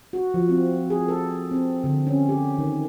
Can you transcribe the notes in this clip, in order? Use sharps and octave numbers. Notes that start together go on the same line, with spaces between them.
F#4
F3
C4
G#4
A4
C4
D3
C#4
G4
D#3